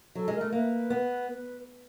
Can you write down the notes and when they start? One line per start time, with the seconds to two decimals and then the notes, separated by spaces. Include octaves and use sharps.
0.15 F#3 A4
0.28 G#3
0.34 A#4
0.41 A3
0.52 A#3 B4
0.90 B3